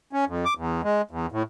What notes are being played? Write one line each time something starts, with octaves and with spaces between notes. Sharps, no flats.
C#4
F2
D6
E2
G#3
E2
A2